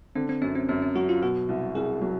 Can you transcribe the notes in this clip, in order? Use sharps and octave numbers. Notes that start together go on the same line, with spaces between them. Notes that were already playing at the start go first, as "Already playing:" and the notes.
D3 C4
C4
F#2 C#4
C4
F#2 C#4
C#4
F#3 F#4
F4
B2 F#4
C2
C2 G#4
F#3